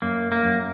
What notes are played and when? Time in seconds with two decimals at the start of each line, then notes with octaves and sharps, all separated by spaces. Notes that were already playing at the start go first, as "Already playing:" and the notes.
0.02 F#2 A#3
0.32 A#3
0.45 F#2